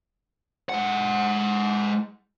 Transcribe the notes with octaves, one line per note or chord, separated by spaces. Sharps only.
G#3 F#5